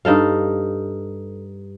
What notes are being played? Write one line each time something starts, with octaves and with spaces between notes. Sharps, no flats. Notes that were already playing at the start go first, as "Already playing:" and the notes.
G2 D#4 A4 F5